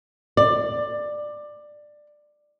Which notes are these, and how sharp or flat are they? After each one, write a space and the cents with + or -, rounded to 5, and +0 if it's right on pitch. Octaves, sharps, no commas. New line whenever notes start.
D5 +15